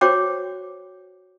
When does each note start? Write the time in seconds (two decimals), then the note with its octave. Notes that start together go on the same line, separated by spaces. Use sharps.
0.01 F#4 C5 C#5 G5 C#6 D6